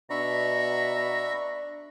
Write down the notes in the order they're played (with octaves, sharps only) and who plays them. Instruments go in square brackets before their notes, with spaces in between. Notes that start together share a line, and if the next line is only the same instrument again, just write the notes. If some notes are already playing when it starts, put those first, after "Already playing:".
[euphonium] B2 [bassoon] D4 [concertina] E5 B5 C#6 [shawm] A#5